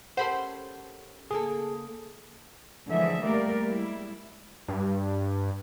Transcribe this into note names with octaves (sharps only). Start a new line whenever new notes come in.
C#4 G4 A4 A#4 C5 F#5 B5 C6
C#3 A#3 G#4 A4
D3 E3 F3 G#3 G#4 E5
G3 A3 A#3 G4 A#4 D5
G3 G#3 E4
G2